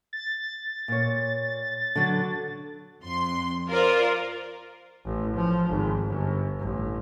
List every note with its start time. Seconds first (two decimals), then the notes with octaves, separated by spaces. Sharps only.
0.13 A6
0.88 A#2 C#5
1.96 D3 F#3
3.02 F2 C6
3.69 F4 A#4 C5 D5
5.06 A1
5.36 F3
5.69 G#1
6.06 G1
6.59 A1